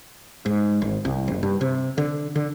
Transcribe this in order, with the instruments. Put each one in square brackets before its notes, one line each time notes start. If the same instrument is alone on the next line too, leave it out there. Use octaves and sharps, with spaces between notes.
[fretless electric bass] G#2
G#1
C2
F#1
G2
C3
D3
D3